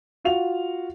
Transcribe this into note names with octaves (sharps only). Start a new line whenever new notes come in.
F4 F#4 F5 F7